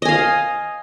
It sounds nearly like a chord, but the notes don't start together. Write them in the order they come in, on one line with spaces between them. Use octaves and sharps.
D#5 G#5 F5